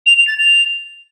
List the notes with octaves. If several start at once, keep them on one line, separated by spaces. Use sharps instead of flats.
F7
F7
A6
F7